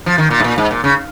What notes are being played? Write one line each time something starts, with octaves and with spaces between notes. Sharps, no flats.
F3
D#3
A#2
G#2
A#2
G#2
A#2
C#3